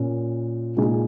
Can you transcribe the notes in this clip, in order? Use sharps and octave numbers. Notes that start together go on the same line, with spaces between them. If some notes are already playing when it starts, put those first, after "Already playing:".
Already playing: A#2 A#3 C#4
A#2 G#3 D#4 G#4